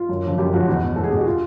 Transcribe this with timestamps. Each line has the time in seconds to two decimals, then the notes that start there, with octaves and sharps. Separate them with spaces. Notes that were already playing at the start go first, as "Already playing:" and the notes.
Already playing: F4
0.09 F#2
0.23 C#3 F3
0.38 F#2 G4
0.53 C#3 F3 F#4
0.67 E2 F#4
0.83 B2
0.96 E2 A4
1.04 G#4
1.10 B2 G4
1.19 F#4
1.26 F4